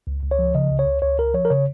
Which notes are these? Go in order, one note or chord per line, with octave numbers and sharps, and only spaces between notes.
C#2
C#2
C#5
F3
C#3 D#5
C#2
C#5
C#2
C#2 C#5
C#2 A#4
F3 C#5
A#4
C#3 C#5